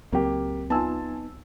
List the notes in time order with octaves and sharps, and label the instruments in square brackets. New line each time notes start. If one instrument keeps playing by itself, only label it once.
[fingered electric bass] C#2 F#3 C4 [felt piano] A#3 G4
[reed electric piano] B3 D#4 E6 [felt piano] F4 G#5 A5